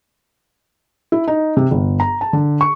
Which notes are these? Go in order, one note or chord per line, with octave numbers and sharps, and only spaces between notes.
E4
D#4
C3
G1
A#5
A5
D3
C#6